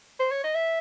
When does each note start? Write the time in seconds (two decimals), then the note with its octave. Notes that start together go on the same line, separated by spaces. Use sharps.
0.19 C5
0.31 C#5
0.44 D#5
0.55 E5